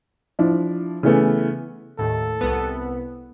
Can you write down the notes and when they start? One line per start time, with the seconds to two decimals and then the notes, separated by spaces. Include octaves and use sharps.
0.39 F3 D4 E4
1.03 C#3 E3 A3 B3
1.99 D#2 A2 A4
2.41 C2 B3